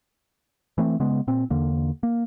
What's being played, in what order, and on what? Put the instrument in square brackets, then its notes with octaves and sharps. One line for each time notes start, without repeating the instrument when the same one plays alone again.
[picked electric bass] E3 A3 C4
C#3 G#3 B3
A#2 C4
E2 D3 A#3
A#3